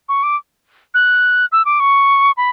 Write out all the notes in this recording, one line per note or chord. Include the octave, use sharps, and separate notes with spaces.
C#6
D6
F#6
E6
D6
C#6
B5